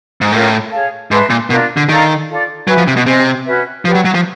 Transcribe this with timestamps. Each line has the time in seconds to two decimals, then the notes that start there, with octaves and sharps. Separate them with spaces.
0.21 G#2
0.32 A2 C#4 F4 A#4
0.72 G#4 C#5 F5 A5
1.11 G#2 B4 E5 A5 C6
1.30 A#2
1.50 B2 D4 F4 A#4
1.77 D3
1.89 D#3 A4 D5 F5 A#5
2.29 F4 A4 D5
2.67 F#3 F#4 B4 E5 G#5
2.77 F3
2.87 C3
2.97 B2
3.06 C3 C5 D#5 G#5
3.46 C#4 F#4 B4 E5
3.85 F3 G4 B4 D5 F#5
3.95 F#3
4.05 F#3
4.15 F3